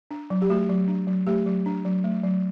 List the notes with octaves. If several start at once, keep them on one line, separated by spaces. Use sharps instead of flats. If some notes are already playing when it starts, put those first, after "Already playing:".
D4
F#3
G4
A3 F#4
F#3
D4
F#3
A3 G4
F#3
D4
F#3
A3
F#3